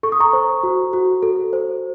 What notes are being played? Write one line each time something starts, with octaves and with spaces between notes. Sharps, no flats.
A4 C#6
D#6
A#5 C#6
C5
F#4
F#4
A4
C5